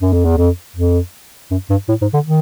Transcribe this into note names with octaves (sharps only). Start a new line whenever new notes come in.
F#2
F2
E2
F2
F2
F#2
G2
A2
G#2
D3
D#3